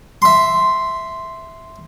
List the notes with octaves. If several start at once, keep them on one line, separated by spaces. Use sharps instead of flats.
E5 C6